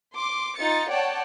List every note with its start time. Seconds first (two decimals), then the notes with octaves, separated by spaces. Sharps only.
0.16 C6 D6
0.58 D#4 F4 A6 C#7
0.89 C#5 D5 F#5 G5 A5